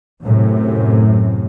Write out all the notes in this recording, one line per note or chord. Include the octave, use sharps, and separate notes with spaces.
F#2 A2 C3